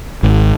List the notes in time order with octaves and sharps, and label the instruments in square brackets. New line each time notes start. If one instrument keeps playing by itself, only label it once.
[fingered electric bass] G#1